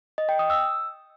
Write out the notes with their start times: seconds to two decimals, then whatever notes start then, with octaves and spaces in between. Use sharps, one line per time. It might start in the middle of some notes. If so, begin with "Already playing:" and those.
0.18 D#5
0.29 G5
0.39 D#6
0.50 E6